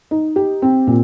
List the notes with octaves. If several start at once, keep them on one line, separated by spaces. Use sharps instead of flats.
D#4
G4
C4
A#2